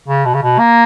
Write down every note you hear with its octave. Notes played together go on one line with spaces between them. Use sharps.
C#3
B2
C#3
B2
A#3